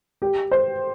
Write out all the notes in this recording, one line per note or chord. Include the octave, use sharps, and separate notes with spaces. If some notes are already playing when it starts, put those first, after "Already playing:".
G4
C5